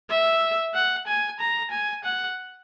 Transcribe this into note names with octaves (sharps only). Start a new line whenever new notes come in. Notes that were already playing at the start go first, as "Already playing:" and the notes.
E5
F#5
G#5
A#5
G#5
F#5